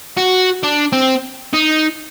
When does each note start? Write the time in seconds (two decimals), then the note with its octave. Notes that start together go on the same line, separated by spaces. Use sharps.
0.17 F#4
0.63 D4
0.93 C4
1.54 D#4